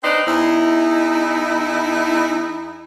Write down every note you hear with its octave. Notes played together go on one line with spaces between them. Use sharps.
C4 D4 D#4 B4 C5
E2 D#4 E4